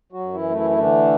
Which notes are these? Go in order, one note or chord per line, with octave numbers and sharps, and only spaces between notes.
F#3 F#4
F#2
E3 E4
A3
E3 E4
E4
D3 E3 D4